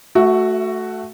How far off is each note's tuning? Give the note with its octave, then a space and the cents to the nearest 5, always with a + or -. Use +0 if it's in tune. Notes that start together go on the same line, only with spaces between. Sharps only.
A3 -10 F#4 +0 E5 +25